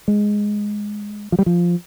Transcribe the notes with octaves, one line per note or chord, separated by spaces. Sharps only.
G#3
F3
G3
F3